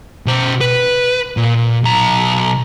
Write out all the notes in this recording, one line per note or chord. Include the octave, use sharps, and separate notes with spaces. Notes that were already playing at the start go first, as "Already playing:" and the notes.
B2 C5
B4
A#2
B1 A#5